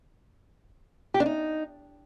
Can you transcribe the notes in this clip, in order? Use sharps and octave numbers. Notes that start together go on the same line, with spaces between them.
G4
D4
D#4